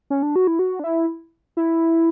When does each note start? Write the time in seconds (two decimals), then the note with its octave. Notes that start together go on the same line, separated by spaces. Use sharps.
0.10 C#4
0.23 D4
0.36 F#4
0.47 E4
0.59 F#4
0.79 D4
0.84 E4
1.57 E4